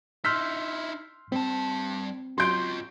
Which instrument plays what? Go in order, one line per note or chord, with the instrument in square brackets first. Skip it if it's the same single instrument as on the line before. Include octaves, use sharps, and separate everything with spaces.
[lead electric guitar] D#4 E4 [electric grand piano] C6 F6 B6 [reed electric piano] E6 G6
[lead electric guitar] G3 A5 [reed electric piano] C4
[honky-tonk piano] F#3 G6 [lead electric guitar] C#4 F4 [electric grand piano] C6 D7